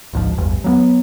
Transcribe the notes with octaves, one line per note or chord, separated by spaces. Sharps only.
A1 D2 G#2 F3
A1 E2 G2
F#3 A#3 B3